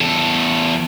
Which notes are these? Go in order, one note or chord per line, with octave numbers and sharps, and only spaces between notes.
E2 A4